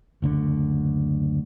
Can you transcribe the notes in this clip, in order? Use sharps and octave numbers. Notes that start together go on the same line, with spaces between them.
F#1 D2 D3